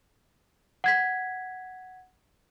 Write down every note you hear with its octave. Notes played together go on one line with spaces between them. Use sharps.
F#5 G#6 B6